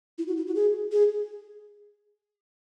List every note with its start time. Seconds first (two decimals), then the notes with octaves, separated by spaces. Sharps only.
0.18 E4
0.28 F#4
0.37 E4
0.47 F#4
0.55 G#4
0.92 G#4